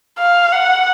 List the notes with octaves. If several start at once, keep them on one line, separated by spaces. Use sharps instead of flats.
F5
F#5